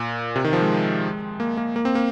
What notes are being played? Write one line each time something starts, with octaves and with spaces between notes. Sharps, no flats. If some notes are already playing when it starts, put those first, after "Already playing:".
Already playing: A#2
C3
D#3
F3
G#3
A#3
A#3
A#3
C4
A#3